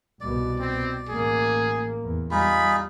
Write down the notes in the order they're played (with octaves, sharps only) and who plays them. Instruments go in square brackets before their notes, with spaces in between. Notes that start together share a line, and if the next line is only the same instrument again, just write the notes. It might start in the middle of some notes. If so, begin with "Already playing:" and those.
[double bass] C2 B2 [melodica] D5
[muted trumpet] C4
[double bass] A1 A#3 [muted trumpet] G#4
[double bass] E2
[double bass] G3 [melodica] D#4 F4 G#4 [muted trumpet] B5